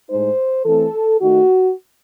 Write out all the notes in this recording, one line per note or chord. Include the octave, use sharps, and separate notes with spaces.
A2 G#3 D#4 C5
E3 A3 C4 A4
D#3 A3 D#4 F#4